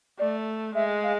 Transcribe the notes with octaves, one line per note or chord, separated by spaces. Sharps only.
A3 D5
G#3 E5
F5